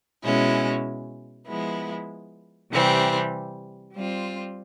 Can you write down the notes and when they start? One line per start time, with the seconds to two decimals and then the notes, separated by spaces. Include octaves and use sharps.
0.24 B2 G#3 C#4 E4
1.47 F3 G#3 B3 E4
2.72 C3 E3 G3 C4
3.94 G3 C4 F4